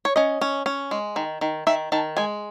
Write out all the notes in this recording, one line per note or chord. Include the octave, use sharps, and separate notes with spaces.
C#5
C#4 D#5
C#4
C#4
G#3
D#3
D#3
D#3 E5
D#3 A5
G#3 G#5